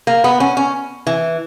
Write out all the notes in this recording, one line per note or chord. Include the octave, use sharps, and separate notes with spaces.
A#3
B3
C#4
C#4
E3